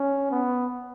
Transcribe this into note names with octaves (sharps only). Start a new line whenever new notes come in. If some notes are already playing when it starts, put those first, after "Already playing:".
Already playing: C#4
B3